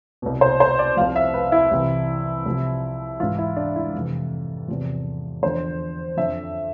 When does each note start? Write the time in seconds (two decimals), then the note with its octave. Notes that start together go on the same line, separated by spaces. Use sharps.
0.22 C2 B2
0.41 C5
0.60 C5
0.79 D5
0.97 C2 C3 F3 F5
1.16 E5
1.34 B4
1.52 E4
1.71 C2 C3 E3
2.46 C2 C3 F3
3.20 G#2 E3 F4
3.39 E4
3.56 D4
3.76 E4
3.94 F2 C3 E3
4.68 E2 C3 F3
5.43 E2 D3 F3 C5
6.17 F2 D3 F3 E5